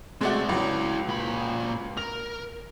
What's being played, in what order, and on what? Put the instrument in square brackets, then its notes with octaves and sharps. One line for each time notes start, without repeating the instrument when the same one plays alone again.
[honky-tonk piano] G#3 A3 F#4 [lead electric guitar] C4 D5
[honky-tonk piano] C#2 F#3 [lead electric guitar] E4 D5
[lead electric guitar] A#2 B5
[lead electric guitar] A#4 [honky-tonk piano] F7